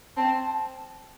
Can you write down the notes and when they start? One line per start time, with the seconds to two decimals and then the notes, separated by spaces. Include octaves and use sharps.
0.17 C4 A5